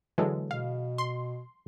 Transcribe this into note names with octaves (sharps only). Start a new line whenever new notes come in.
D3 E3 F#3 G#3 A4
B2 F5
C6